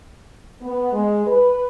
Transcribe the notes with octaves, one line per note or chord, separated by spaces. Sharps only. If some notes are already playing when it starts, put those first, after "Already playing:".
B3
G#3
B4